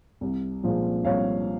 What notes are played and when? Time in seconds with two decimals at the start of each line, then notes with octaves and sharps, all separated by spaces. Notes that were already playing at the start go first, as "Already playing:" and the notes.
0.21 C2
0.63 A#2 F3 G#3
1.05 C2 C#5 F5